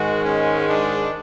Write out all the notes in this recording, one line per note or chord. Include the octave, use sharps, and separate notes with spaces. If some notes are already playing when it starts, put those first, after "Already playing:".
Already playing: G#2 D#3 G#3 F#4
C#4
D4